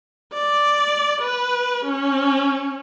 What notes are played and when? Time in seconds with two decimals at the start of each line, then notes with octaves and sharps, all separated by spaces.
0.33 D5
1.22 B4
1.86 C#4